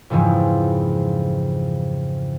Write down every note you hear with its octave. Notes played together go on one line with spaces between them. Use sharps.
F2 G#2 C#3 E3 F3